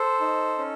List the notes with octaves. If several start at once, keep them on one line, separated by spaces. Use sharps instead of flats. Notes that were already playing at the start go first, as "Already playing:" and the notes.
Already playing: A4 C5
D#4
C#4